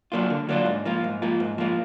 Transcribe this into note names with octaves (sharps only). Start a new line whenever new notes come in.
F#3 A#3 D4 F4
D3
F#3 A#3 D4 F4
G#2
F3 A#3 F4
G#2
F3 A#3 F4
G#2
F3 A#3 F4